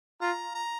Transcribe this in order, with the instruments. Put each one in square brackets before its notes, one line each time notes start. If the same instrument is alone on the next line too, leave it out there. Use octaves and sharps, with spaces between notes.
[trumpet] F4 [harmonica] A#5
[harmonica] A#5